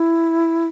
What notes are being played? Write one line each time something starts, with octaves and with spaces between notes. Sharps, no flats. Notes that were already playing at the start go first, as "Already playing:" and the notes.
Already playing: E4